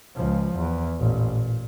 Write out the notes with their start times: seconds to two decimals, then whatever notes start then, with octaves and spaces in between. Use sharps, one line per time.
0.16 C#2 F3
0.56 E2
1.00 A1 A#2
1.35 A#2